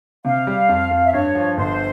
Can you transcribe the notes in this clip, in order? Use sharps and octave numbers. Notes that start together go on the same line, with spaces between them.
C3 F5
G3
F2
F2
E5
G2 C#5
F3
G1 C5